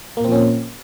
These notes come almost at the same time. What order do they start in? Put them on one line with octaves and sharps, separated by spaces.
A#3 A#2 C4 F3 C#4